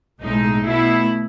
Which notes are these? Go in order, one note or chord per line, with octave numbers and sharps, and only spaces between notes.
B1 A2 G#3 D#4
B2 A3 E4